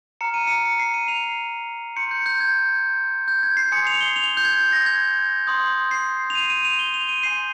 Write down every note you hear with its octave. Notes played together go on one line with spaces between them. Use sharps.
A#5 F6 C#7
D#7
C#7
C#7
C7
D#7
F7
C6 G6 C#7
G6
G6
G#6
G6
G#6
C7
G#5 C6 D#6 G6 C#7
F7
G7
F7
G6
G#6
G#6
A#6
G#6
C6 D#6 G6
C7
F7
D#7
D#7
F7
G7
F7
D#7
G#5 C6 G6 C7